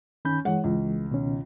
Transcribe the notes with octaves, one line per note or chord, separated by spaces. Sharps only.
D#3 C#4 B5 G6
E3 G#3 C#5 F#5
C#2
B2 D#3 C#4